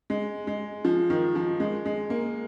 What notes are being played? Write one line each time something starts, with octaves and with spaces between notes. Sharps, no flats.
G#3
G#3
F3
D#3
F3
G#3
G#3
A#3